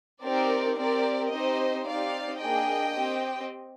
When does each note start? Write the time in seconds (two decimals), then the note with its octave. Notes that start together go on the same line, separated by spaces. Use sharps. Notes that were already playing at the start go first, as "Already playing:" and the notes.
0.24 C4 D#4 G4 A#4 D5
0.78 C4 G4 A#4 D5
1.32 C4 D#4 G4 C5 D#5
1.87 C4 D#4 G4 D5 F5
2.42 A#3 D4 G#4 D#5 G5
2.96 C4 G4